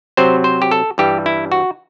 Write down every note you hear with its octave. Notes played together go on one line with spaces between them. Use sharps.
C3 F#3 C4 C5
C5
G4
A4
G2 E3 G3 G4
E4
F#4